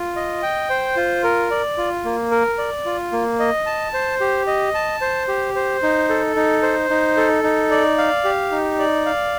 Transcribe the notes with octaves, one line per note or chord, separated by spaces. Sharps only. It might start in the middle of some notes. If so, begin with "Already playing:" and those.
Already playing: F4
D#5
G5
C5
F4
A#4
D5
F4
A#3
A#4
D5
F4
A#3
D#5
A5
C5
G4
D#5
A5
C5
G4
C5
D#4
A4
D#4
C5
D#4
A4
D#4
D5
F5
G4
D#4
D5
F5